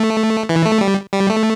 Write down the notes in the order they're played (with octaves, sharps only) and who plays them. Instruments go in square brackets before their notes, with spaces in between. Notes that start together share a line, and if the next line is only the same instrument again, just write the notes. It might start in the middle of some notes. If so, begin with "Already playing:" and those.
Already playing: [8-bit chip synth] A3
E3
A3
G3
G3
A3